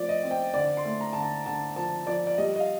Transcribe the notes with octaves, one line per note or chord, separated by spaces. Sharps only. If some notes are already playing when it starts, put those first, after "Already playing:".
Already playing: A2 F3 C4 D5
D#5
C4
G5
D3 D5
C6
A3
A#5
D3 A5
A#5
D3 A5
F3 A5
F3 D5
D5
G3 D#5
D#5
F5